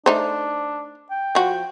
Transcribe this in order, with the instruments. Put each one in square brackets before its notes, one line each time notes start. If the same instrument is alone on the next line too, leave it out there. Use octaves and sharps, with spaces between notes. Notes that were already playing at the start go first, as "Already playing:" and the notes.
[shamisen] A3 D#4 C5 [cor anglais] D4
[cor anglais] G5
[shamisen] F3 F#4